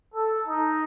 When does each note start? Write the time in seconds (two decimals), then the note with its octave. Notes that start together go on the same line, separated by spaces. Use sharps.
0.14 A4
0.48 D#4